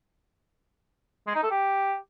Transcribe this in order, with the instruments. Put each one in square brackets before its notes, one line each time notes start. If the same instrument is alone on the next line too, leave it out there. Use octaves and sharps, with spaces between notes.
[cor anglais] G#3
D#4
A4
G4